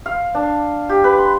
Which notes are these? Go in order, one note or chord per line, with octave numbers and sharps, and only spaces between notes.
F5
D4
G4
B4
C6